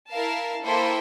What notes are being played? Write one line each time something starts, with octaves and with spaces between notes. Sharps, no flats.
E4 A#4 F5 A5
A#3 E4 A4 C5 G5